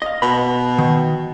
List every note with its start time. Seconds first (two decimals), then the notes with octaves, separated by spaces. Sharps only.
0.02 D#5 F5
0.22 B2 B5
0.78 D#3